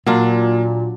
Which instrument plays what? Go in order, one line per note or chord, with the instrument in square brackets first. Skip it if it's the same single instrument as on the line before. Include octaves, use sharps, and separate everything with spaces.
[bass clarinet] A#2 [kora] F#3 D4 F4 [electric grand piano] A#3